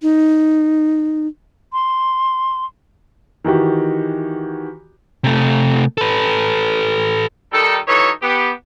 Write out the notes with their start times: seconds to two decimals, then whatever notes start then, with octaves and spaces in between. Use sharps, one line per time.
0.02 D#4
1.73 C6
3.44 D#3 E3 F#4 G4
5.24 C3 A3
5.98 A4 B4
7.52 D#3 G3 D#4 A4
7.88 E3 F#3 D#4 A4 C#5
8.22 B3 G4